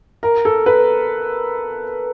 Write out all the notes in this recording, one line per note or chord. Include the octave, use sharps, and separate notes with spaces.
A#4
A4
B4